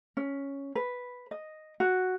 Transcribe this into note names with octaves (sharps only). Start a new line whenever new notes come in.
C#4
B4
D#5
F#4